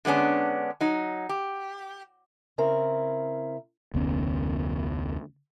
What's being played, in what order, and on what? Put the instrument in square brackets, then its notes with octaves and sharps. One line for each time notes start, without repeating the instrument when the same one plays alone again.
[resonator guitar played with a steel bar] D3 G#3 B3 C#4 D4
F#3 D#4
G4
[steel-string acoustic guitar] C#3 C4 E4 A#4
[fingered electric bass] F1 D2 B3 C#4